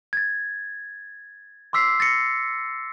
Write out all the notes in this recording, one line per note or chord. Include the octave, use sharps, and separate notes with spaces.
G#6 A6
C6 D6 E6 B6 C7
A6 A#6 C#7